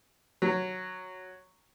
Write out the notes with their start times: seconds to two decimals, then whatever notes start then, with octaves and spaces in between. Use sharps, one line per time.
0.42 F#3